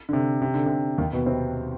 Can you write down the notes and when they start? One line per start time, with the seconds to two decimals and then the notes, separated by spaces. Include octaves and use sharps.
0.09 D3
0.13 C3
0.41 C3
0.54 D3
0.66 C3
0.98 D#2 D#3
1.13 B2 B3
1.26 C3 C4